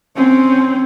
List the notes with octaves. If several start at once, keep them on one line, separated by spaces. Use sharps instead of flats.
C4 C#4